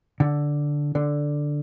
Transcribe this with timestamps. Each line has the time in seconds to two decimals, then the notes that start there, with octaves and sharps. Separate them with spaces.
0.20 D3
0.95 D3